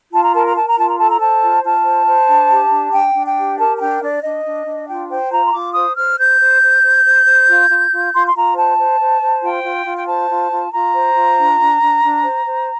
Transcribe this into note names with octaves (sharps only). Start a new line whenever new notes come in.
F4 A5
A#5
A#4 A5
A#5
A#4 A5
A#5
F4 A5
A#5
A4 A5
A#5
C5 A5
F4
F4 A5
C5
C5
D4
G4
D4
D4 G5
D4
G5
G4
A#4 A5
A5
D4 G5
D4 D5
D4 D#5
D4
D4
F4 G5
C5 G5
F4 A#5
C6
F4 D6
C5 D#6
C5 F6
C5 G6
C5
C5
C5
C5
C5
F4
F4
F4
F4 C6
C6
F4 A#5
C5 A5
C5
C5
C5
F4 G5
F4
F4
G5
C5 A5
F4
F4
F4 A#5
C5
F4
D4
D4
D4
D4
C5
C5